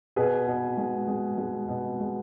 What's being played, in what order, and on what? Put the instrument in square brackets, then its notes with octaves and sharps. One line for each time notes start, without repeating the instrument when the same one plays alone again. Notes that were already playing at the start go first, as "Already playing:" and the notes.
[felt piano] B2 G#4 B4
B2
G#3
G#3
G#3
B2
G#3